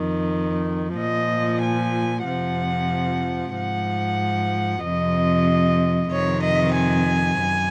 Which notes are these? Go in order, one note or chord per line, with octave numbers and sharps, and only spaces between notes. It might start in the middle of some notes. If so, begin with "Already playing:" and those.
Already playing: F2 D#3
A#2 F3 D#5
G#5
F2 C3 F3 F#5
G#2 F3 F#5
F2 C3 F3 D#5
F2 C3 D#3 C#5
D#5
G#5
F#2